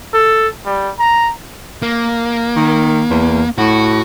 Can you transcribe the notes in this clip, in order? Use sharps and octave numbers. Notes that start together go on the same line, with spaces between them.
A4
G3
A#5
A#3
D#3
E2
A2 F#4